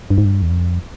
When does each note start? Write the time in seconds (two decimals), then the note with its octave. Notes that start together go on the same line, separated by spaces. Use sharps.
0.10 G2
0.18 G#2
0.25 G2
0.42 E2
0.51 F2